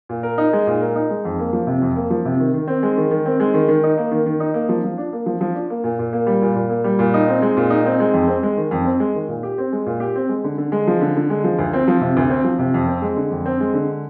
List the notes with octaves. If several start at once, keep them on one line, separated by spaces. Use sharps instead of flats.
A#2
A#4
D#4
G#3
A#2
A#4
D#4
G#3
F2
A#3
F3
C3
F2
A#3
F3
C3
D#3
D#3
C4
G#3
D#3
D#3
C4
G#3
D#3
D#3
D#4
A#3
D#3
D#3
D#4
A#3
F3
F3
D4
A#3
F3
F3
D4
A#3
A#2
A#2
A#3
G3
A#2
A#2
A#3
G3
A#2
D#4
C4
G#3
A#2
D#4
C4
G#3
F2
C4
G#3
D#3
F2
C4
G#3
D#3
A#2
G4
C4
G#3
A#2
G4
C4
G#3
D3
D3
G#3
F3
D3
D3
G#3
F3
D2
C4
F3
C3
D2
C4
F3
C3
F2
C4
G#3
D3
F2
C4
G#3
D3